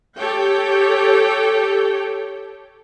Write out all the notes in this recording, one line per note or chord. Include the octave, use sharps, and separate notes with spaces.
G4 A4 C#5 G5